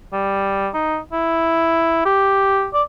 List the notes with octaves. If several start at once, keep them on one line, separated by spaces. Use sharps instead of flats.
G3
D#4
E4
G4
D5